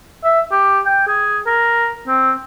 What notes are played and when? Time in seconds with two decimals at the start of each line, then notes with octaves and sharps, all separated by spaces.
0.24 E5
0.51 G4
0.86 G5
1.07 G#4
1.46 A#4
2.07 C4